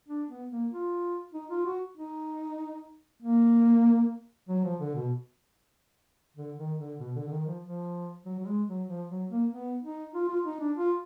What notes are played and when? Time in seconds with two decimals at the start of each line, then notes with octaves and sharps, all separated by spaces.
0.08 D4
0.30 B3
0.51 A#3
0.72 F4
1.34 D#4
1.50 F4
1.66 F#4
1.97 D#4
3.22 A#3
4.49 F#3
4.64 F3
4.80 D3
4.95 B2
6.36 D3
6.58 D#3
6.79 D3
6.99 B2
7.16 D3
7.27 D3
7.31 D#3
7.47 F3
7.63 F3
8.25 F#3
8.38 F#3
8.46 G#3
8.68 F#3
8.88 F3
9.09 F#3
9.30 A#3
9.50 B3
9.83 D#4
10.14 F4
10.29 F4
10.45 D#4
10.60 D4
10.77 F4